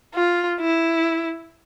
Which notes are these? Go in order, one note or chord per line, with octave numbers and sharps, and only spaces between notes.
F4
E4